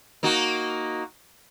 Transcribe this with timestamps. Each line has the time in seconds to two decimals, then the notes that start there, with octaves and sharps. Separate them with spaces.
0.23 A#3 D#4 F#4